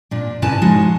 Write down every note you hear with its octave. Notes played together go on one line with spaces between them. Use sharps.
A#2 D4
A#2 C#3 E4 B4 G#5 A5
F3 G#3 D#4 F#4